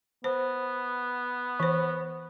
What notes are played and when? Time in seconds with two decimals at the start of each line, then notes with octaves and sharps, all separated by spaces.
0.24 B3 C5
1.60 E3 C5